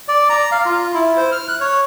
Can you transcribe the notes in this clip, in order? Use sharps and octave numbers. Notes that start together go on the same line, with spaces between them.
D5
A#5
F5
F4
E4
C5
F6
F#6
C#5